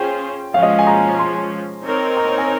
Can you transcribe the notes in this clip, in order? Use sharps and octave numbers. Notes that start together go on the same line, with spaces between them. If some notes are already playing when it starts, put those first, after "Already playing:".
Already playing: C#4 F4 G#4 C5 G5
F3 G#3 C#4 F5
D#5
G#5
A#5
C6
C4 D#4 A#4 C#5
A#5
A#5
G#5